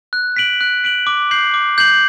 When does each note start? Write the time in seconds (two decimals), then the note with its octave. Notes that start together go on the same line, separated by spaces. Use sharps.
0.13 F#6
0.36 B6 D7 F#7
0.61 F#6
0.84 B6 D7 F#7
1.07 D6
1.31 G6 C7 F#7
1.54 D6
1.78 G6 C7 F#7